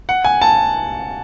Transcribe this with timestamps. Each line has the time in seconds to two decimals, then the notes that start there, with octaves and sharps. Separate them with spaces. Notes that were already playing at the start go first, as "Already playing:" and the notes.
0.09 F#5
0.25 G#5
0.42 A5